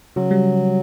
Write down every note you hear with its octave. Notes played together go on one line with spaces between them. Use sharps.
C#3 F#3
G3